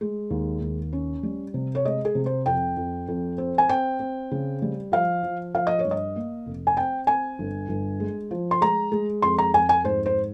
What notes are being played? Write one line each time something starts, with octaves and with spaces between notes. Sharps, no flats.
G#3
D#2
D#2
C#4
G3
C3
C#5
G#3 D#5
G#4
C3
C5
F2 G5
F2
F2
C4
G#5
C4 G5
C4
C#3
G3
F3 F5
F3
F3 F5
D#5
C#5
G2
D#5
A#3
F1
G#5
C4 G5
C4 G#5
G1
G1
G#3
F3
C6
G#3 A#5
G#3
F2 C6
A#5
F2 G#5
G#5
G#2 C5
C5